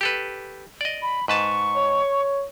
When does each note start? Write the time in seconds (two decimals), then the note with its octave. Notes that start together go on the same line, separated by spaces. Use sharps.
0.01 G4 A4 B4
0.81 D5 D#5
1.02 B5
1.28 G#2 B4 A5 C#6
1.75 C#5